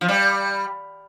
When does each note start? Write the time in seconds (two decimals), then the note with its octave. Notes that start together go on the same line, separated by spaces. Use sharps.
0.01 F3
0.08 G3